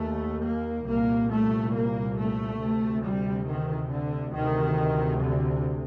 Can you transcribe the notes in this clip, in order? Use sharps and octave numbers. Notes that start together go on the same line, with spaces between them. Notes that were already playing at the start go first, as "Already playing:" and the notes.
Already playing: D#2 A3
A#3
C2 A#2 A#3
A3
A#3
A3
D2 C3
G3
D#3
D3
D2 C3 D#3
D3